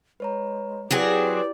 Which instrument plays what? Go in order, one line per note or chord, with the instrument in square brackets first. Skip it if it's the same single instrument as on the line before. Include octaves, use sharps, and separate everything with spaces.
[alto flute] G#3 [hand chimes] B4 C#5 A#5
[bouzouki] F#3 C4 G#4 [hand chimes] E4 [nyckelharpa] G4 D5 [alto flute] B4